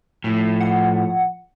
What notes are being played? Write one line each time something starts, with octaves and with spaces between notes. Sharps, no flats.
A2 F3
F#5